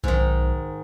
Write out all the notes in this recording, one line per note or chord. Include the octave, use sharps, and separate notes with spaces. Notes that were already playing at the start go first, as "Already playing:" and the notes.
B1 G#2 D#3